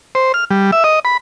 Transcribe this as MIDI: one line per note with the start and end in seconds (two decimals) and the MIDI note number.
0.15 0.32 72
0.34 0.45 89
0.51 0.71 55
0.72 0.83 76
0.84 0.99 75
1.05 1.17 83